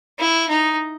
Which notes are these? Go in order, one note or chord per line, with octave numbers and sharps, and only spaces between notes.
E4
D#4